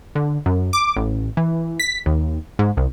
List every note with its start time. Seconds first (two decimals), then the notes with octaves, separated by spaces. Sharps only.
0.15 D3
0.46 F#2
0.73 D6
0.96 A1
1.37 E3
1.80 B6
2.06 D#2
2.59 G#2
2.77 C2